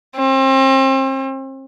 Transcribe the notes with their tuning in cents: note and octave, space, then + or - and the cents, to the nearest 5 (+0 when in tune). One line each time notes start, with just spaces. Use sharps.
C4 +35